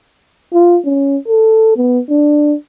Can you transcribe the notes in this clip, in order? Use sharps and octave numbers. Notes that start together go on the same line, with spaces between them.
F4
C#4
A4
B3
D4